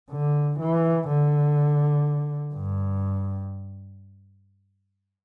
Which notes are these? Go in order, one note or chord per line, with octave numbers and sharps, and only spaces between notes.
D3
E3
D3
G2